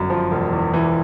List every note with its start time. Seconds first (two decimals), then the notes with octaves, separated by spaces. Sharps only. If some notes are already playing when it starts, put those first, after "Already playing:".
Already playing: G1 F#2
0.10 F3
0.31 E1
0.52 E2
0.74 E3